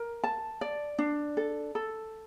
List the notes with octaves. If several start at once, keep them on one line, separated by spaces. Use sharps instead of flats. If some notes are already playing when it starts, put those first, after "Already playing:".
Already playing: A#4
A5
D5
D4
A4
A4